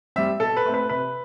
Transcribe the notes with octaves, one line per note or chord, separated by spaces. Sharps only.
G3 C4 E5
B2 A4
B4
A3 C4
B4
C3 B4